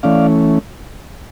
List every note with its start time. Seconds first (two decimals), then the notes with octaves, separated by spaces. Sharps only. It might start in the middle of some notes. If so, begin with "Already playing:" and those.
0.03 E3 A3 C#4 D5 F5